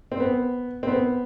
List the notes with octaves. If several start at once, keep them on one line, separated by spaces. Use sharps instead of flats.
C4
B3
C4
B3